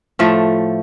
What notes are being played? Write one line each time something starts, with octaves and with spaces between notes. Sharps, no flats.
A2 F3 A3